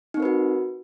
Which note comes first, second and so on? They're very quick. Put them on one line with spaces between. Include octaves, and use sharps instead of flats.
D#4 C4 A#4 B4 F#4